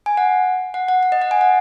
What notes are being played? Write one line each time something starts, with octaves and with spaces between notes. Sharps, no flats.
G#5
F#5
F#5
F#5
F#5
D#5
F#5
G#5
F#5